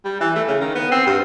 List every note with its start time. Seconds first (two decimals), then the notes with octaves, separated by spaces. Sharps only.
0.05 G3
0.20 E3
0.35 A3
0.48 C#3
0.60 D#3
0.75 B3
0.92 C4
1.06 G2